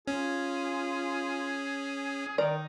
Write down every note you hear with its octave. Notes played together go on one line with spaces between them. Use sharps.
C#4 F4 G#4
D#3 D#4 A#4 D5